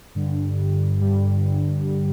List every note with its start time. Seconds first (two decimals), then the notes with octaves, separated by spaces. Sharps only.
0.15 G2 D3 G3
1.01 G2 D3 G3